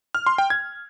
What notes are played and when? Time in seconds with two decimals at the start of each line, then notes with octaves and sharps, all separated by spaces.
0.15 F6
0.26 C6
0.38 G5
0.50 G#6